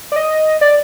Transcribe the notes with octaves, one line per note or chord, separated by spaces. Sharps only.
D5
D#5
D5